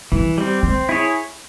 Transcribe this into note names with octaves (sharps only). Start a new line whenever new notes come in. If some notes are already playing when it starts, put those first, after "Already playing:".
E3 G3
G3 C4
G#3 C4
E4 G#4 C#5